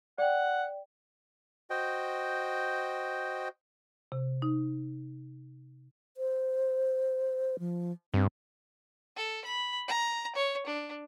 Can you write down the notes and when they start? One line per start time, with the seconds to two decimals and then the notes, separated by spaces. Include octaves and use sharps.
0.18 D5 F#5 G5
1.70 F#4 C5 D#5 G5
4.12 C3
4.42 D#4
6.17 C5
7.59 F3
8.14 G2 C4
9.16 A4
9.45 B5
9.88 A#5
10.35 C#5
10.67 D4